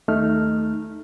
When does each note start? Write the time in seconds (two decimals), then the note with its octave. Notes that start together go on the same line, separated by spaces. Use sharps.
0.08 D#2 A3 D#4 F6